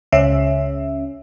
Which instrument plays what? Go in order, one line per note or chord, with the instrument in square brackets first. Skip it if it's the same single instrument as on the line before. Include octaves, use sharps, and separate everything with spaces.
[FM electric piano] C#2 C#3 C#4 E5